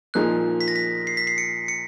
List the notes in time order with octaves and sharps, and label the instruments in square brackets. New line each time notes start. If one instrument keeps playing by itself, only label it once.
[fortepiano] A#2 F3 A#3 D#4 G#4 [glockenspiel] F#6
[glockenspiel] B6
A#6
B6
C7
B6
C7
C#7
C#7